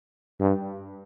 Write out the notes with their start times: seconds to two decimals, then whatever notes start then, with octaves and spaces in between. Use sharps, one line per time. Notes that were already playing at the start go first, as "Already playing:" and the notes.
0.40 G2